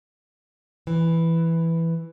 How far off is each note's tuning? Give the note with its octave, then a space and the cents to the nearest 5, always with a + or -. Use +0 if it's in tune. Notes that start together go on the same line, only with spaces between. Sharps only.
E3 +5